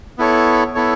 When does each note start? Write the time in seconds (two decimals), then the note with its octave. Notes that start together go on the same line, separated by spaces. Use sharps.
0.18 B3 E4 A4 C#5
0.75 B3 E4 A4 C#5